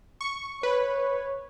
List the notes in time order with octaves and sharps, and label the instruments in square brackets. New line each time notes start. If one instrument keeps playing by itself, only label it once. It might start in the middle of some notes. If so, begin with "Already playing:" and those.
[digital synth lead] C#6
[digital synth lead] B4 [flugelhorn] C#5